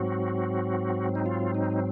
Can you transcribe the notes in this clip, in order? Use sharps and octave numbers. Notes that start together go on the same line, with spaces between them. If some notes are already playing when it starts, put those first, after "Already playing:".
Already playing: G#2 F#3 C4 F#4
D#4
F4
D#4